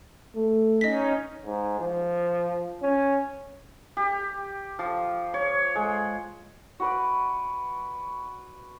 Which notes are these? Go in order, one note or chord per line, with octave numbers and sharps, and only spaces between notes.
A3
C#4 D#4 D#5 B6
G#2
F3
C#4
G4
F3
C#5
G#3
F#4 B4 D5